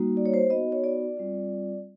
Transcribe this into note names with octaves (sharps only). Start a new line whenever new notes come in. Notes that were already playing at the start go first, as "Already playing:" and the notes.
Already playing: G3 A#3 D#4 F#4
D5
C#5
C5
B3 D#4 F#4 D#5
C#5
D5
G3 C4 F4